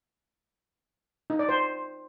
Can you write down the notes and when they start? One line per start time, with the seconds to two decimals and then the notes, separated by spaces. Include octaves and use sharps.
1.30 D#4
1.39 D5
1.49 C5